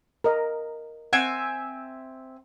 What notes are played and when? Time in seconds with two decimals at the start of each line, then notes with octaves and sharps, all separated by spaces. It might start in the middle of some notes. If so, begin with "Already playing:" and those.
0.24 A#4 D#5
1.13 C4 E5 F#5 G#5